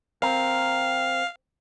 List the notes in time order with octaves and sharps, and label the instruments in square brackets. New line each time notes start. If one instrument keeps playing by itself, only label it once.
[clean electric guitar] C4 A#4 [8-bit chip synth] F5